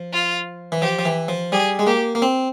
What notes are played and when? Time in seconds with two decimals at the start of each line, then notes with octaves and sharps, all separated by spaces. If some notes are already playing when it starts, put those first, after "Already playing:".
Already playing: F3
0.13 F4
0.72 E3
0.82 F3 G4
0.99 F3
1.05 E3
1.28 F3
1.52 G3 G#4
1.79 G#3
1.87 A#3 G4
2.15 A#3
2.22 C4